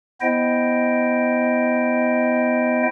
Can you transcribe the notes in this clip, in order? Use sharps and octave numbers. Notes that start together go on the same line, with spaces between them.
B3 E4 C5 D#5 G5